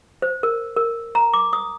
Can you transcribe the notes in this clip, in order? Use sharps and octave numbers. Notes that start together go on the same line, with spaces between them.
C5
A#4
A#4
A#5
D6
D#6